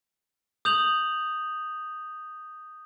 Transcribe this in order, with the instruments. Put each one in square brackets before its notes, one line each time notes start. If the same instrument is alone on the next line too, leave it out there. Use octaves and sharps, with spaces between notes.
[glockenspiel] D#6 G6 F7 F#7